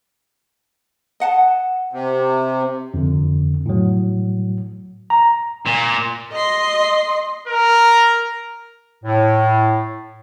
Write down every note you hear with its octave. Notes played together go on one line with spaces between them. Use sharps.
D#5 F#5 A5
C3
F2 D3
A2 F#3
A#5
A#2
D#5 C6
A#4
A2